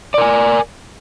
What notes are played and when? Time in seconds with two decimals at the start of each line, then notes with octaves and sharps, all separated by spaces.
0.14 D5
0.18 A#4
0.22 G#5